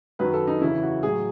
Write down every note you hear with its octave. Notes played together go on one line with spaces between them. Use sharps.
F#2 D#3 F#3 B4
A4
D#4
E2 C#3 E3 E4
F#4
A2 F#3 G#4